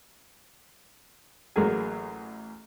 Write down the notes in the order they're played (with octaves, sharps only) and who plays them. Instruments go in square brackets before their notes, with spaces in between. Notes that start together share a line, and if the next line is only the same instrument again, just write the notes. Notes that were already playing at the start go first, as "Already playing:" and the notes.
[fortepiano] A1 F#3 A#3 G#4 G#5